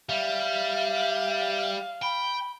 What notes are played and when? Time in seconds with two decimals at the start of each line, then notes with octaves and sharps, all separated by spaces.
0.09 G3 E5 F5
2.03 G5 B5